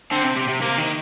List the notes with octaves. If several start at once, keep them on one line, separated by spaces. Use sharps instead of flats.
D3 C4
C3
C3
C3
C3 A#3
D#3